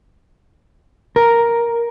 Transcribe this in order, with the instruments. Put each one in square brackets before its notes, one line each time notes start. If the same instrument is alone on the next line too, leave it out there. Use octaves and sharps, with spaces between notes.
[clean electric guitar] A#4